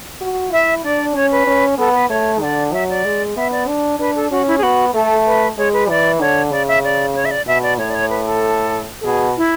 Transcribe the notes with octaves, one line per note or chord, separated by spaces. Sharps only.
F#4
E4 E5
D4 D5
C#4 C#5
B4
C#4
B3 A4
B4
A3 C#5
D3 D5
F#3 E5
D5
G#3
B3 E5
D5
D4
D4 B4
A4
C#4 F#4
E4
G#4
B3 F#4
A3 A4
B4
G#3 C#5
B4
E3 D5
D3 C#5
C#3 D5
E5
D5
C#5
E5
D5
B2 E5
D5
A2 C#5
D5
C#5
B4
A4
A4
B2 G#4
E4